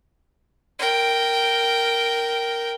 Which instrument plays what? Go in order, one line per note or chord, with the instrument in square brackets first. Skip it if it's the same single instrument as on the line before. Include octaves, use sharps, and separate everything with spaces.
[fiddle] A#4 G5